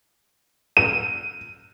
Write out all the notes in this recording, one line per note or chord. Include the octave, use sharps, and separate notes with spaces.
D#7